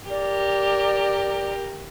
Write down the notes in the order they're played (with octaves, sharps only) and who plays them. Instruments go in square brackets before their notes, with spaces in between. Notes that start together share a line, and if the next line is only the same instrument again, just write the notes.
[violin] G4 A#4 [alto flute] D5